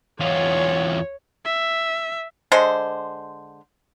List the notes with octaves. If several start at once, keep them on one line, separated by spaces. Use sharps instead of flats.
E2 F4 C#5
E5
D3 G#3 C5